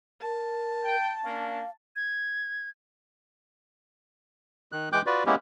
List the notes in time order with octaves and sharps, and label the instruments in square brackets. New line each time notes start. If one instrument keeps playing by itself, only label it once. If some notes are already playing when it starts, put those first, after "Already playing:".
[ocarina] A#4 [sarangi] A5
[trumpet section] G5
[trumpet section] A#3 C#4 D4 [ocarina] F5
[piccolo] G#6
[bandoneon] D#3 F#6
E3 G#3 G5 D6 F#6 G6
F4 F#4 B4 D5
G#3 A#3 B3 C#4 E4 G4